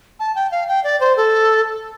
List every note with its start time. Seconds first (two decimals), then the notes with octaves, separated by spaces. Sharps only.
0.20 A5
0.35 G5
0.51 F5
0.68 G5
0.84 D5
1.00 C5
1.17 A4